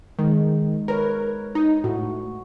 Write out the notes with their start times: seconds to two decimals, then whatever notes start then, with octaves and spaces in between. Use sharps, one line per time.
0.19 D#3 G#3 D#4
0.88 A#4 B4 C#5
1.55 D#4
1.84 A2 F#4